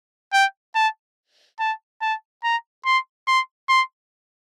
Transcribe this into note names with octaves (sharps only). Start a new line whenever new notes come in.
G5
A5
A5
A5
A#5
C6
C6
C6